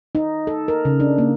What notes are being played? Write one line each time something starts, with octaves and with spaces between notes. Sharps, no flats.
D#4
A4
A#4
C#3
D4
A#3